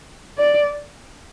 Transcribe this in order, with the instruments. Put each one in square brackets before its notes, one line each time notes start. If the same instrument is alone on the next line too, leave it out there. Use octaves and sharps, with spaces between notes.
[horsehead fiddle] D5